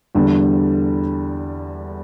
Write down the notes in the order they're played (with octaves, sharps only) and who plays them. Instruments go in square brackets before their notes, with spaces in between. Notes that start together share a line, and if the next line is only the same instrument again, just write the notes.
[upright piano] E2 D3 G3